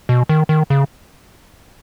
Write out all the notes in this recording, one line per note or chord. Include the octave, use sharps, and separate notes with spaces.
B2
D#3
D#3
C#3